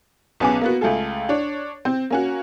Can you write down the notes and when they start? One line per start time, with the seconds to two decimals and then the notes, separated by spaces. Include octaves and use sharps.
0.40 B1 B3 C#4 G#4 G#5 D6
0.61 A#3 B3 F#4
0.81 C#2 A3 F4 G#4 A4
1.29 D4 C#5
1.85 C4
2.10 A#3 C#4 F#4